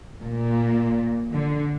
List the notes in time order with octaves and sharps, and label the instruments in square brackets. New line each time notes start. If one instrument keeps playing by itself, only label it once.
[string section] A#2
D3